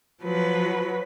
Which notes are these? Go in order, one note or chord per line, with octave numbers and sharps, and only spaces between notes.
F3 F#3 B4